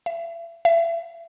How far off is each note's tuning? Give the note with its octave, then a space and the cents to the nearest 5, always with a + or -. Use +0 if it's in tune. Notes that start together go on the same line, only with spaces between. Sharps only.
E5 +35
E5 +30